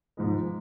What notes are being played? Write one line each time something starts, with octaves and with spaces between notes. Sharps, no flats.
G#2 F3 G#3